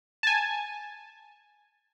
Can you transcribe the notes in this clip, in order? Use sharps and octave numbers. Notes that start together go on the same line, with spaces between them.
G#5 A5